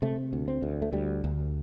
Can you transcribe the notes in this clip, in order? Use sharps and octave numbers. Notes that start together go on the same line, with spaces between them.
C3 A3
D2
C4
D2
A3
D2 G3
D2